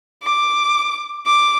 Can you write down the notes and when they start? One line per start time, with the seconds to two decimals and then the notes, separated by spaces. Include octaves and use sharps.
0.23 D6
1.26 D6